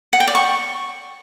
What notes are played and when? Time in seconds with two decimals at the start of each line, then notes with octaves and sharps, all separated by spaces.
0.13 F#5
0.20 G5
0.28 D5
0.35 C#6